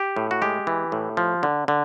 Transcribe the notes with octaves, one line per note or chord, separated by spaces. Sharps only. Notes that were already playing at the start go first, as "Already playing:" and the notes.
Already playing: G4
A2
F#4
G#3 G4
E3
A2
F3
D3
D3